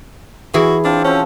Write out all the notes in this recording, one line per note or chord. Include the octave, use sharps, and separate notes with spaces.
E3 E4 F#4 G#4
C4 D4 F4 A4
F3 C#4 F#4 C5